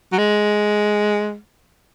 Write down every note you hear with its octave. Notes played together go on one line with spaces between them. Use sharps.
F#3
G#3